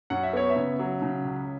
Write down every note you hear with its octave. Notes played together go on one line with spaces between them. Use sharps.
F#2 F#5
E5
B3 C#5
E5
C#3
F#3
C#3
C#2